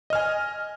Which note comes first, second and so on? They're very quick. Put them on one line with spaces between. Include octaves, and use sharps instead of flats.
D#5 F6 G#5